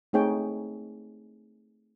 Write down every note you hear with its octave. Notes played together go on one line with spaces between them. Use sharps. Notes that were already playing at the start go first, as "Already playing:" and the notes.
A3 C4 D#4 G#4 C#5 G5